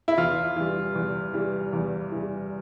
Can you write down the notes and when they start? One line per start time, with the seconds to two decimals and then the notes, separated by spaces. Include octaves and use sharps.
0.08 E4
0.18 E2 F4
0.56 E3 G3
0.95 E2
1.34 E3 G3
1.73 E2
2.12 E3 G3